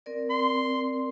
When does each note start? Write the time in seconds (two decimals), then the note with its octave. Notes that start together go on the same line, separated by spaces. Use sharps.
0.06 C4 A#4 D5
0.30 C6